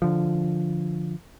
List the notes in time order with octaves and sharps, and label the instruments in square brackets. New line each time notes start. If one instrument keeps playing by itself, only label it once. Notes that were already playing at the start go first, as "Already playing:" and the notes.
[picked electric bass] D3 F3